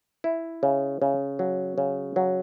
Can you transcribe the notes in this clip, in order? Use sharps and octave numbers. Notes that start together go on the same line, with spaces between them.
E4
C#3
C#3
F#3
C#3
F#3